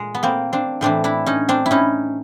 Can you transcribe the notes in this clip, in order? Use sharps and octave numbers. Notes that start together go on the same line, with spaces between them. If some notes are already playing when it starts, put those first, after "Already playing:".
Already playing: A#2 G#3
B3
A#3 C4
C4 D4
A2 E3 C4 D4
D4 E4
C#4 D#4
C4 D4
E4
C#4 D#4